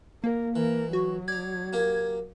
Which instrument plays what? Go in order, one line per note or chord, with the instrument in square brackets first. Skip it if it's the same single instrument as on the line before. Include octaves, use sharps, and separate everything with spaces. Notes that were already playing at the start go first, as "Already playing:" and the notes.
[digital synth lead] A#3 [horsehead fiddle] A#4
[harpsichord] E3 [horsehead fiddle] A#4
[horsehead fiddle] F#3 [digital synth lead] F#4
[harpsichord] D5 A#5 [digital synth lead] G#6
[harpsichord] A#3 G4 A#4